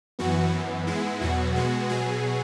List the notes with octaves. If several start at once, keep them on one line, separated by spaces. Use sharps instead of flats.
F#2 E3 B3 F#4
F#2 E3 B3
G#2 G#3 B3 E4
E2 B2 F#3 B3 F#4
B2 G#3 B3 F#4
B2 F#3 B3 G#4